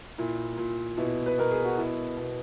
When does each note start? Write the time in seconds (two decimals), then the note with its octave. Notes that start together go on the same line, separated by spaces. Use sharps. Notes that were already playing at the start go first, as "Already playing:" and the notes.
0.18 A#2 E4
0.57 A#2
0.97 B2 E4
1.26 B4
1.38 B2 A#4
1.51 G#4
1.64 F#4
1.78 B2 E4
2.17 B2